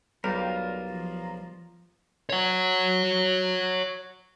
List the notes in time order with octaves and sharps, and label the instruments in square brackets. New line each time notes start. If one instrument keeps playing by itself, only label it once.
[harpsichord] B1 [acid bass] G3 [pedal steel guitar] F4 A#4
[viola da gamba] F3
[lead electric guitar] C#5 F#5